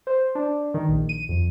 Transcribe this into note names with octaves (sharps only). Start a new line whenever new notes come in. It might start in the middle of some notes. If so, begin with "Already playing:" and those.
C5
D4
D#3
A#1
D#7
F2